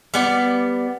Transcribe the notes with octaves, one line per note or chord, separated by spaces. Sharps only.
G3 B3 D5